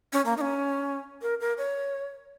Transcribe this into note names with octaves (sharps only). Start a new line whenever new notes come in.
C#4
A#3
D#4
C#4
A#4
A#4
C#5